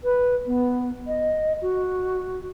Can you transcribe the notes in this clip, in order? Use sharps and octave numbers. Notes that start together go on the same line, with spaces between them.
B4
B3
D#5
F#4